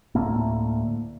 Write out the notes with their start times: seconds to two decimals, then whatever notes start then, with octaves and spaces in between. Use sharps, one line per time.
0.15 D2 A2 A3 A#3